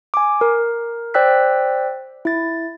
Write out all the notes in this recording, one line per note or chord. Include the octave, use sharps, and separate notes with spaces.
G#5 D6
A#4
C5 D5 G5 E6 F#6 B6
E4 A6